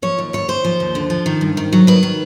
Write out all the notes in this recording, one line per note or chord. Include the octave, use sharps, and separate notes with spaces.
F3 C#5
D#2
D#2 C#5
D#2 C5
F3
D#2
D3
F3
D#3
G2
D#3
F#3
D#3 B4
D#3